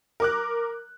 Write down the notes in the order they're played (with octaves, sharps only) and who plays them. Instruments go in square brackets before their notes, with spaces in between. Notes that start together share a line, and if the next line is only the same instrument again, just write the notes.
[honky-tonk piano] A#4 D6 F#6